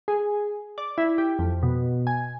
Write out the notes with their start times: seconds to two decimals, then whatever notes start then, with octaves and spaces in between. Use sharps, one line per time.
0.08 G#4
0.78 D5
0.98 E4
1.18 G4
1.39 F2
1.63 B2
2.07 G#5